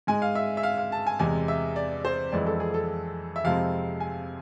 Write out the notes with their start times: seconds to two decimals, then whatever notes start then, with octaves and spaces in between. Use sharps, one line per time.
0.07 G#2 G#3 G#5
0.22 F5
0.35 E5
0.57 E5
0.63 F5
0.78 F5
0.92 A5
1.07 G#5
1.19 E2 C3 G#3 G#5
1.48 E5
1.76 D5
2.05 C5
2.32 F2 E3 G#3 D5
2.46 A4
2.60 G#4
2.74 A4
3.36 E5
3.44 F2 C3 F3 G#3 F5
4.00 G#5